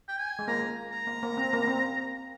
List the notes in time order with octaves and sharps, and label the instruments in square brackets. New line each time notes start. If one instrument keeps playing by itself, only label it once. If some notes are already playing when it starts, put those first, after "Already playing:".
[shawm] G5
G#5
[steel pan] G#3
[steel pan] A#3 [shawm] A#5
[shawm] A#5
[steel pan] A#3
A#3
C4
A#3
C4